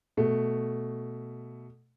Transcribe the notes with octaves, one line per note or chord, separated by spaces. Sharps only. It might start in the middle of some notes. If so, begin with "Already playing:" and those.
B2 A3